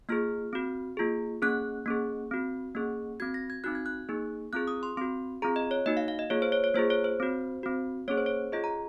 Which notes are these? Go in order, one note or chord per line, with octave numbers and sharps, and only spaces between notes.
A#3 F4 G#4 F6
C4 F#4
A#3 F4 G#4
A#3 C#4 G#4 F#6
A#3 C#4 G#4
C4 F#4
A#3 C#4 G#4
C4 F#4 G#6
A#6
G#6
C4 D#4 F#4 F#6
G#6
F#6
A#3 D#4 G#4
C4 F4 G#4 F#6
D#6
C6
C4 F#4 C6
C4 F4 G#4 A#5
D#5
C#5
A#3 D#4 F#4 D#5
F5
F5
D#5
A#3 F4 G#4 C#5
C5
C#5
C#5
A#3 F4 G#4 C5
C#5
C5
C4 F#4
C4 F#4
A#3 C#4 G#4 C#5
C5
C#5
C#4 F4 G#4 D#5
A#5